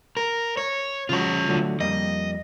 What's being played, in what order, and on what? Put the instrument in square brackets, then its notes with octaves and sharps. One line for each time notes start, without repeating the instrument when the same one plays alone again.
[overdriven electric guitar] A#4
C#5
[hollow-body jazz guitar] C#3 F3 F#4 [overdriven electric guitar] F4 C#5
[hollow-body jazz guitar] D3 F#3 A3
[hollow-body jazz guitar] F2 G3 A#3 [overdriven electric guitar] D#5